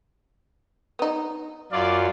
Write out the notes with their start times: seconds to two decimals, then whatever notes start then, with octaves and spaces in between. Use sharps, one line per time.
0.99 B3 D#4
1.72 F#2 F4 D5